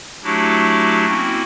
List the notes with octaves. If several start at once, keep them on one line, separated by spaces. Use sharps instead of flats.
F#3 A3 D4 E4 F#4 G4
A#3 C4 C#4 E4 F#4